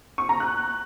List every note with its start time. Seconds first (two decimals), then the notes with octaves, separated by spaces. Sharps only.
0.18 C#6
0.29 A#5
0.40 F#6